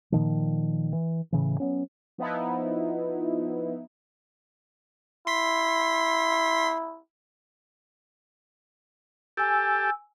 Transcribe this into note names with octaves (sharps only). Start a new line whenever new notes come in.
A#2 D#3 F3
E3
A2 C#3 E3
F#3 B3 C#4
F3 B3 D#4 E4
E4 C6 B6
G4 A4 G#5 E6